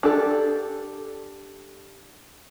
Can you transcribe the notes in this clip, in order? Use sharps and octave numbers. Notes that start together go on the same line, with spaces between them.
D4 G4 A4